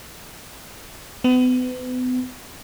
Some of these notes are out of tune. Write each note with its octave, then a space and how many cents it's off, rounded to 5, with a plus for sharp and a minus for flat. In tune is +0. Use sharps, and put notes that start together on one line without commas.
B3 +35